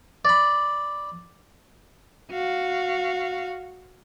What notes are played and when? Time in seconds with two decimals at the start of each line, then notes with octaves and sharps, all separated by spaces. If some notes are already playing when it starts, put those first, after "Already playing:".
0.25 D5 B5
2.31 F#4 F5